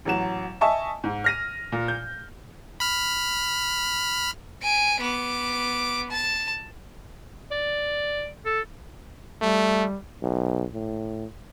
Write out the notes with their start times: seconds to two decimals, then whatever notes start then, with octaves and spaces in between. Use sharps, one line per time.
0.05 A1 F#3 E7
0.61 D#5 E5 G#5 A5 C#6
1.04 G#2
1.24 F6 A#6 D#7
1.72 A#2
1.88 G6
2.80 B5 F6
4.63 G#5 D7
5.01 B3 D6
6.11 A5
7.51 D5
8.45 A4
9.42 G3 A3
10.22 B1
10.73 A2